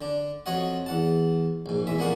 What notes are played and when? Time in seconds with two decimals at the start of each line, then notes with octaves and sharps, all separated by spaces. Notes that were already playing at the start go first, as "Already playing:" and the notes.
0.01 D3 D4
0.46 F2 F3 F#4 C#5 D#5 F#5
0.86 E2 F#5 A5
1.66 A#1 G#2
1.87 E2 G#3 E5
1.98 F2 A#2 A#3 F#5 C#6 D#6